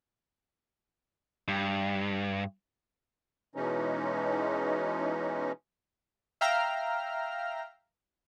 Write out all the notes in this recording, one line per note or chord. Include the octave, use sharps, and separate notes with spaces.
G2
B2 E3 G#3 C#4 D#4
E5 F5 G5 A#5 F6